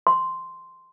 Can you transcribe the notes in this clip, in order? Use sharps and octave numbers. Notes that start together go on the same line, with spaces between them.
C6